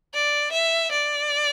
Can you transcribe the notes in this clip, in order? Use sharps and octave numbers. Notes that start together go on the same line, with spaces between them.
D5
E5
D5